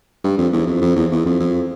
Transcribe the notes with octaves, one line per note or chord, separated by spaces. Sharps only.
G2
F2
E2
F2
F2
E2
E2
F2
F2